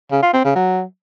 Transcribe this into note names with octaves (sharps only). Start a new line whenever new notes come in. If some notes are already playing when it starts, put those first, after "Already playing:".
C#3
F4
C4
C#3
F#3